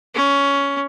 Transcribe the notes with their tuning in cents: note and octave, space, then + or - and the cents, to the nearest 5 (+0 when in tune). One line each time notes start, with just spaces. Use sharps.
C#4 +15